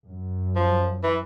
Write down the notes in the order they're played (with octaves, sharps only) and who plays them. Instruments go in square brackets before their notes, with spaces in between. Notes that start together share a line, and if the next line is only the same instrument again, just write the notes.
[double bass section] F#2
[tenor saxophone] F3
E3